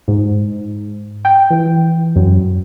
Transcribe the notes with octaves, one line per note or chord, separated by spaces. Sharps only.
G#2
G5
E3
F#2